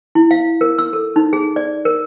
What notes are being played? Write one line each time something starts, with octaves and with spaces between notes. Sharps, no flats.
E4
F5
A#4
E6
A4
D#4
G#4
D5
A#4